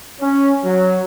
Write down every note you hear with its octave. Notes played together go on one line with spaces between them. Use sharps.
C#4
F#3